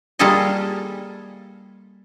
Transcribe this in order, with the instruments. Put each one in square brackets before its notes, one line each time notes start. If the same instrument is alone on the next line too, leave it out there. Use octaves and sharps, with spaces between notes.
[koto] G3 A#3 F4 G#4 A4 D#5